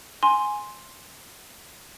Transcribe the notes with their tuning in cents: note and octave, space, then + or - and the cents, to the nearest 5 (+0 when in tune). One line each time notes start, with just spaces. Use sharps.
G#5 +0 C6 +5